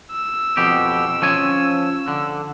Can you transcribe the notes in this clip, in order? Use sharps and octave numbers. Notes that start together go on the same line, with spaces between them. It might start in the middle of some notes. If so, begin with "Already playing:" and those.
E6
F2 B2 G4
F3 C#4 G#5
D3